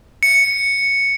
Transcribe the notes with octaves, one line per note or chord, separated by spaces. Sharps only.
C#7